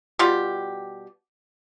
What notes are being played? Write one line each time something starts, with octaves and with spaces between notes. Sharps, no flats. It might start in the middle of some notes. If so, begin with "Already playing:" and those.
B2 G3 F4 G4